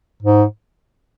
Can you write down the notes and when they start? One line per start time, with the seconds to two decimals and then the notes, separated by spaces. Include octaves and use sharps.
0.23 G#2